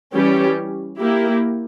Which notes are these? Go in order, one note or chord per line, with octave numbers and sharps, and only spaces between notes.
E3 G3 C#4 G4
A#3 E4 G4